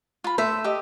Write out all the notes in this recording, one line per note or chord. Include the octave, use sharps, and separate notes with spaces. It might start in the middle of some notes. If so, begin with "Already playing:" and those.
F4 B5
A3 E5 C6
G4 D#5